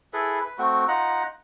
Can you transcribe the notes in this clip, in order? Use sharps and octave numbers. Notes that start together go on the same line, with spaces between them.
E4 G#4 A4 B4
B4
A3 C4 F#4
D#4 F4 F#5 A#5